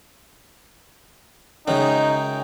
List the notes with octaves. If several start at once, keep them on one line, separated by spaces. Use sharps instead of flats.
F#2 C#3 G#3 D#4 G5